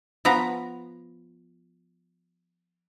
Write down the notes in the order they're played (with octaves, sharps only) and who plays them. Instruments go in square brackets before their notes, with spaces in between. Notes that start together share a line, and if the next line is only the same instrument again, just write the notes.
[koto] F3 B3 B4 A#5